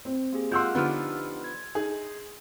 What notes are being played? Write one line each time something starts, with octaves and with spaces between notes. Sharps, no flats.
C4
A#3 G4 G#4
G#3 A#3 F4 F#5 C6 E6 F#6 G6
D3 F3 B3 D#4 G4 B4 F6
G#6
D#4 G#4